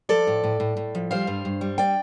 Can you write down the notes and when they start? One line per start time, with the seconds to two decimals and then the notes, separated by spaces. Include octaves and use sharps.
0.09 F3 A4 D5
0.27 A2
0.44 A2
0.60 A2
0.77 A2
0.95 F3
1.11 G3 C5 F5
1.27 G2
1.45 G2
1.61 G3
1.78 D5 G5